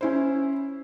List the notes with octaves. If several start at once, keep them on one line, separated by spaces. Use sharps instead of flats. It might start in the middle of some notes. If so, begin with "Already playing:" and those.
C#4 E4 C5